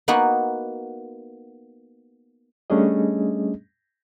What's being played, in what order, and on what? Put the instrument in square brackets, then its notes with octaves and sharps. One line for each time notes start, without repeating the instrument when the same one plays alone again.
[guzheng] A#3 B3 D#4 F#4 B4
[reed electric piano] G3 A3 C#4 D4 G#4 D#5